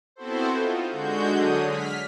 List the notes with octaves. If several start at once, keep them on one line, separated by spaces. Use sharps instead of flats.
B3 C4 E4 F#4 A4 C5
D#4 F4
D3 G#3 F#4 G6
D3 F#3 G#4 D#6
F6 B6